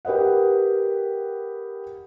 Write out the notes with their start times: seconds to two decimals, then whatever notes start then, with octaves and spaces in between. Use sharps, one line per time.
0.05 G4 A#4 B4 D#5 F#5